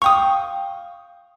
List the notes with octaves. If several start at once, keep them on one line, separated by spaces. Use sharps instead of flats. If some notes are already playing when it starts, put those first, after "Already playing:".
F5 G5 C#6 D#6